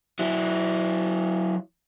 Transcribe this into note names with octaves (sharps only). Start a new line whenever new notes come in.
F#3 E4